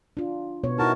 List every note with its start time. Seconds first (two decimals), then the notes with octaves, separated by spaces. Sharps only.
0.17 D4 F4
0.63 B2 B3 C#5
0.79 D#4 E4 F#4 A#4 A5